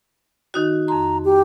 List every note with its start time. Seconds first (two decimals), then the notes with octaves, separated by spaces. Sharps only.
0.54 D#3 D#4 F#4
0.88 F2 A#5 C6
1.25 G4